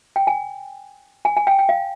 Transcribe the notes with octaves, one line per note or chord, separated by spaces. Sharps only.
G5
G#5
G#5
G#5
G5
G5
F5